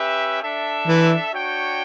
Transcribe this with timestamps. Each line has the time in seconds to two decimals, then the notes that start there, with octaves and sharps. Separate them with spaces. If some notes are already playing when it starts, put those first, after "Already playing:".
Already playing: C#4 G4 B4 E5
0.43 D4 A4 E5
0.87 E3
1.31 D4 F#4 C#5 G5